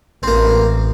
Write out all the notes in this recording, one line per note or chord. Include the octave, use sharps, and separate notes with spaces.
A1 A#3 C4